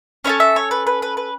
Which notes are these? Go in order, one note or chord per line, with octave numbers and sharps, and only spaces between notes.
C#4 E4 A4 C#5
E5
C#5
B4
B4
B4
B4